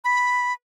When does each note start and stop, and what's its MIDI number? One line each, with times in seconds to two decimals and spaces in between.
0.05 0.53 83